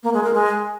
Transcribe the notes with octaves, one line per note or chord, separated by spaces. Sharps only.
A#3
G#3
A#4
G#3